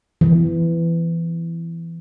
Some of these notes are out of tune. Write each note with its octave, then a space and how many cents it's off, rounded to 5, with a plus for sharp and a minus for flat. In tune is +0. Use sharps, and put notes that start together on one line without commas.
E3 +20